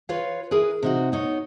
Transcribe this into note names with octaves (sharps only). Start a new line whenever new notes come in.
F4 B4 C#5 F5
E4 G#4 A#4 B4
C3 D#4 F#4
B3 D#4 C#5